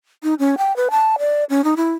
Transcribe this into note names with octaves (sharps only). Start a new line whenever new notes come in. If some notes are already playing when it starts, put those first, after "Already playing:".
D#4
C#4
G5
B4
A5
D5
C#4
D#4
E4